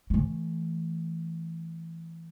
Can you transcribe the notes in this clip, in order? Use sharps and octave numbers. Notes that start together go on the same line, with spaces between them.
E3 A3